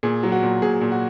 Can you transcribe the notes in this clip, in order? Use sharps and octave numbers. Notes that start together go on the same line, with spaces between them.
A#2 G#4
F#3
F#4
A#2
A#2 G#4
A#2
F#4